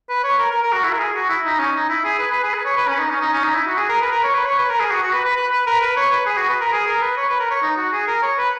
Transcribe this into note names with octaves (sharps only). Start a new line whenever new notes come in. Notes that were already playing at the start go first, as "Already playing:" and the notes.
B4
C#5
A#4
A#4
A#4
F#4
E4
A#4
G#4
F#4
E4
D#4
C#4
D#4
E4
G#4
B4
B4
G#4
B4
C#5
B4
C#4
D#4
C#4
D#4
C#4
D#4
E4
F#4
G#4
A#4
B4
A#4
C#5
B4
C#5
B4
A#4
G#4
F#4
F#4
B4
B4
B4
B4
A#4
B4
C#5
B4
G#4
F#4
B4
A#4
G#4
A#4
B4
C#5
B4
A#4
C#5
D#4
F#4
G#4
A#4
C#5
B4